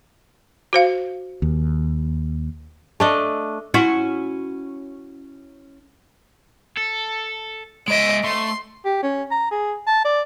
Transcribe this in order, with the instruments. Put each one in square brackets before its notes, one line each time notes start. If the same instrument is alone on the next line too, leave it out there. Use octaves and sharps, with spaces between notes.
[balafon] F#4 C5 F5
[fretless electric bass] D#2
[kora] A3 D4 D#5
[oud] C#4 E4 F#4
[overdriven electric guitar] A4
[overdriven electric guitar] G#3 E5 [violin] D#5 D7
[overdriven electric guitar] A3 [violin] C6
[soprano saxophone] G4
C#4
A#5
G#4
A5
D5